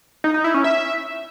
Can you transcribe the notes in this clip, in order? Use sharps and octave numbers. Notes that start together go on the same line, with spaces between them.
D#4
D#4
E4
C#4
E5